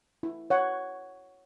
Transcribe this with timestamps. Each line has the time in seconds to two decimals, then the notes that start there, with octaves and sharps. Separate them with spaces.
0.23 E4
0.50 C#5 F#5